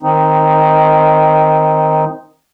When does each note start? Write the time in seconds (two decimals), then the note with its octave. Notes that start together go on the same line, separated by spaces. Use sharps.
0.03 D#3 C4 D#4